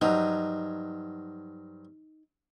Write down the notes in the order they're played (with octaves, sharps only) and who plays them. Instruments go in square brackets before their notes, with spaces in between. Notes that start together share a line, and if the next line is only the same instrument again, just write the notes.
[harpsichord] G2 F3 F#3 [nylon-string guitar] D#4